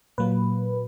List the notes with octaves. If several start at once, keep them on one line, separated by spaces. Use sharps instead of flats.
A#2 F#3 A#3 B4